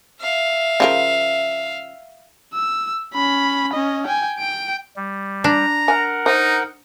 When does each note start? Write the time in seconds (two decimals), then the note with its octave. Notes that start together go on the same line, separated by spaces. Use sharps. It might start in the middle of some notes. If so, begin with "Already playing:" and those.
0.21 E5 F5
0.80 C#3 F3 A#4
2.54 E6
3.14 C#4 B5
3.73 C#4 D#5
4.06 G5 G#5
4.38 G5 D7
4.96 G3
5.44 D4 A#5
5.88 A#4 F#5 G#5
6.26 D#4 C5